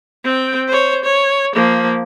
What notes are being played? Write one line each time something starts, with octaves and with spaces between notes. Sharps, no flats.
C4 G5
C5 C#5
C#5
F3 A#3